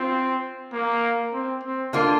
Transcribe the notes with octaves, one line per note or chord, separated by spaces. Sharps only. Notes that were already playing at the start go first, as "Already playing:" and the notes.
Already playing: C4 F4
A#3
C4
C4
D3 A#3 F4